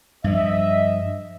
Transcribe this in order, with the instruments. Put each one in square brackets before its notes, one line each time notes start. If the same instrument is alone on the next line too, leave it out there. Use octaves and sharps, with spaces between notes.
[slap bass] G2 F3 [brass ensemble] D#5 E5